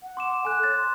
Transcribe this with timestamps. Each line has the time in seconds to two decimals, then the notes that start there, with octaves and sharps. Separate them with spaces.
0.03 F#5
0.17 C6 D6 E7
0.45 A4 G#5 F#6
0.63 C#5 A6
0.78 C6